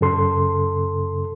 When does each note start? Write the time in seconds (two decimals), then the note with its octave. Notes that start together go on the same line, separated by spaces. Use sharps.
0.01 F#2 C#3 A4 C6